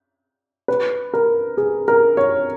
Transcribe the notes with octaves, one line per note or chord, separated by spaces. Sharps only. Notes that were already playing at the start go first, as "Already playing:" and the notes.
B4
A#4
G#4
A#4
C#5